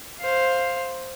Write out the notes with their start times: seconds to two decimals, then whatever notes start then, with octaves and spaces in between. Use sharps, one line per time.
0.20 C5 F5